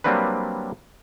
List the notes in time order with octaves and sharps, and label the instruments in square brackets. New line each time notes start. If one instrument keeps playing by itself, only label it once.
[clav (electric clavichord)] F#3 G3 A#3 C4 D4 B4